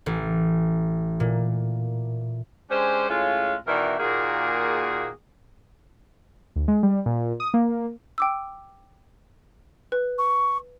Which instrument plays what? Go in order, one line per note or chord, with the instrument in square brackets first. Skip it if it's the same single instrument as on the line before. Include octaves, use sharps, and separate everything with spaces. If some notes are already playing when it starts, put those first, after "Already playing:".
[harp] A1
A#2
[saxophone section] G#3 C#4 D4 G4 C5
A2 G#3 C#4 F4
B2 D#3 E3 A#4 D5 E5
A#2 D#3 A#3 F#4 G#4
[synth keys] D2
G#3
G3
A#2
D#6
A#3
[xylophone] G5 D6 E6
B4
[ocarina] C#6